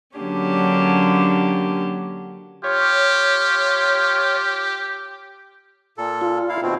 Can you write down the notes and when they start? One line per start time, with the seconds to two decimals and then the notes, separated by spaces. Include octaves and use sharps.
0.18 D3 F#3 A#3 C#4 D4 G4
2.64 F4 G4 C#5
5.98 A#2 A4
6.21 F4
6.49 E4 F5
6.62 D#2 B2 C4